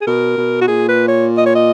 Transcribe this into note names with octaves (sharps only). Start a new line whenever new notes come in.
G#4
B2 A#4
B2
F#4
A#2 G#4
B4
C#5
D#5
C#5
D#5